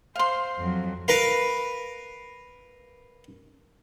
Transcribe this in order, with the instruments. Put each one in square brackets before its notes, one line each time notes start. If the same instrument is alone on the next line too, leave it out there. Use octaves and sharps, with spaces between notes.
[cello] C5 [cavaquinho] F5 C6
[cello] F2 F#3
[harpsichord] A#4 B4 F5